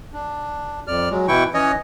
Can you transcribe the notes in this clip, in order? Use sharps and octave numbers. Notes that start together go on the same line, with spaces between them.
D4
F2 D5 F6
F#3 G#3
B2 E3 E4 G5 C#6
E3 C#4 C#5 D#5